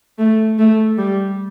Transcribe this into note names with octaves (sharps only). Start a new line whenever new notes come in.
A3
A3
G3